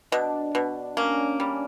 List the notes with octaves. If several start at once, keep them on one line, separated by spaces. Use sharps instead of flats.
B2 D4
B2
A#3 C#4
G3